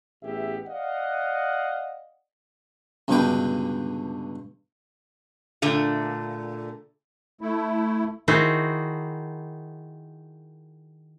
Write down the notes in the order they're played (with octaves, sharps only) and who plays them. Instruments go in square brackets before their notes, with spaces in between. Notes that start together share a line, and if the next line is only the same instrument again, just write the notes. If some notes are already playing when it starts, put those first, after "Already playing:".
[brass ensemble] A1 B3 G4 G#4 E5
D5 D#5 F5 F#5
[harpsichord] C#2 G2 B2 D3 B4 G5
[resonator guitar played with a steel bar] A#2 D3 A3
[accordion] A3 E4
[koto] D#3 D#4 E4 F#4 G#4 C5